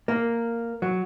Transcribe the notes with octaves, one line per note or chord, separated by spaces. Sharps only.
A#3
F#3